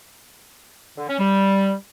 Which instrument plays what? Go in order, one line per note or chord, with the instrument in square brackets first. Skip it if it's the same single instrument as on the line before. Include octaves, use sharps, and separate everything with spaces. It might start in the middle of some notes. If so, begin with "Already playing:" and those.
[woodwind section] D3
C#4
G3